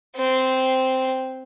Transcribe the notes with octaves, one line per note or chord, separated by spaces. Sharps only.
C4